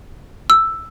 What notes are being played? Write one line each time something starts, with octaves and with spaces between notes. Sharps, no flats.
E6